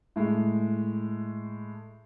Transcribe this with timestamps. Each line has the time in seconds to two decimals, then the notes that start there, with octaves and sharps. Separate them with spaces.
0.16 A2 G#3